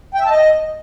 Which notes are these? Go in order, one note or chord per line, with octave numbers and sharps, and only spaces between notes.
G5
E5
A5
D#5